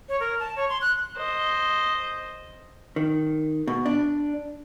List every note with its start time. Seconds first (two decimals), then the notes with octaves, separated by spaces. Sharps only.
0.09 C#5
0.20 A#4
0.39 A5
0.56 C#5
0.69 C6
0.81 F#6
1.17 C5 D#5
2.96 D#3
3.67 B2
3.86 D4